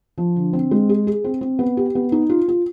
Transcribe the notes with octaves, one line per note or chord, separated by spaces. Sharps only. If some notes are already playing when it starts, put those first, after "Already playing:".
F3
D3
C4
G#3
G#4
G#4
C4
C4
B3
G4
B3
D#4
F4
F4